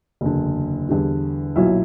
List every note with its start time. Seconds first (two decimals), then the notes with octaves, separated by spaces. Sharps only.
0.21 F#1 E2 D3
0.89 E2 D3 G3
1.56 B1 A#2 F#3 E4